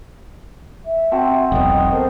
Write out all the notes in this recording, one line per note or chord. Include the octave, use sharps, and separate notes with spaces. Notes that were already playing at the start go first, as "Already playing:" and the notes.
E5
C4 F#4 A5
E1 B1 D#5 D#6
A4 A#4 C5